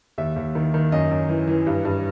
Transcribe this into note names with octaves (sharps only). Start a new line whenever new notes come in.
D#2 E5
D#2
D#3
D#3
F#2 D#5
F#2
E3
E3
G2
G2